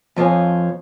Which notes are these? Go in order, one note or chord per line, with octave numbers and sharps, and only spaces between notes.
F2 F3 C5 C#5 G#5